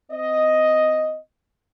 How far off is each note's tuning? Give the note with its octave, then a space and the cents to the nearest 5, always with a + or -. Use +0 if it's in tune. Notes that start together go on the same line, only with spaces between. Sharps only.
C4 -20 D#5 +5